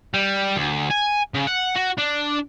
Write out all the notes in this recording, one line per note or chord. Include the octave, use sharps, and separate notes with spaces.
G3
D2
G#5
C#3
F#5
F#4
D4